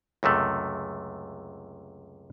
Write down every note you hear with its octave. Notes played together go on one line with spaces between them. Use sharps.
C#2 F#2 C3 A3